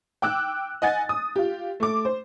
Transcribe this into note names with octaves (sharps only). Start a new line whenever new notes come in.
G5 D6 E6 F#6
D#5 F#5 G#5 A6
D#6
F4 G4
A3 D6
C5